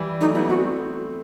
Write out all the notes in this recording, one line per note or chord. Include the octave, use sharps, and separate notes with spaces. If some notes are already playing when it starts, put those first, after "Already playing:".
Already playing: E3 G3
F#3 A3 D#4
G3 B3 E4
A3 C4 F#4